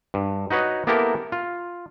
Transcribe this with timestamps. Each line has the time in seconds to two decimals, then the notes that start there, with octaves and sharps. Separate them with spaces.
0.14 G2
0.50 D#4 F#4 B4 C#5 D#5
0.87 A#3 B3 E4 G4 A4 A#4
1.32 F4